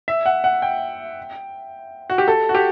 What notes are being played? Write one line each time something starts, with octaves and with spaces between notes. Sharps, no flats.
E5
F#5
F#5
G5
F#4
G4
A4
F#4
G4